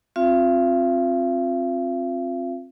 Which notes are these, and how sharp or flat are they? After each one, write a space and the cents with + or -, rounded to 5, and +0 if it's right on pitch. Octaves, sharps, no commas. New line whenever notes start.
C4 +20 F4 +15 F5 -45